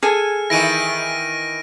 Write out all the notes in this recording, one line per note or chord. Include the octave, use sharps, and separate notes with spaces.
G#4 A4 G#5 F6
D#3 E3 E4 A#6 D7 D#7